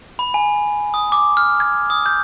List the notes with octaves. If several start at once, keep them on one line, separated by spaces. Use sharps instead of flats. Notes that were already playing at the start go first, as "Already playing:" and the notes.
B5
G#5
D#6
D6
F6
G#6
D#6
G6